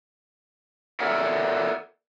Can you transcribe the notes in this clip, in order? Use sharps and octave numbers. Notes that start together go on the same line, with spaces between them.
A4 A#4 C#5 D5 E5 F#5